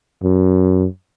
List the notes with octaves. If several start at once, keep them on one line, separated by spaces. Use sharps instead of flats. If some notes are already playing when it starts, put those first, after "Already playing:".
F#2